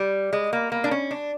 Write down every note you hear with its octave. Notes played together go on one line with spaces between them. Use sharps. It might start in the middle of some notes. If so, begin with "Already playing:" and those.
Already playing: G3
G#3
A#3
A#3
D4
C#4
D4